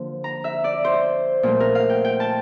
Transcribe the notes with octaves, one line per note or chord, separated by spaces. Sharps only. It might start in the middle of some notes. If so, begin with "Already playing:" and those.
Already playing: D3 F3 A#3
A#5
E5
D5
C5
A#2 F3 A3
A#4
F5
G5
G5
A5